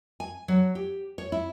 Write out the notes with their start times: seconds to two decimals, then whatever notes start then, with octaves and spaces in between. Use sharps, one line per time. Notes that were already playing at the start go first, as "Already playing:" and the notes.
0.20 G#5
0.48 F#3
0.75 G4
1.18 C#5
1.32 E4